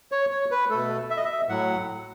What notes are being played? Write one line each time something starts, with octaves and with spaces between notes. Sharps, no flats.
C#5
C#5
B4
B2 A3 A4
E5
D#5
E5
A2 F#3 F#5